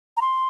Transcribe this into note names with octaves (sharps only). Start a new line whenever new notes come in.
A#5
C6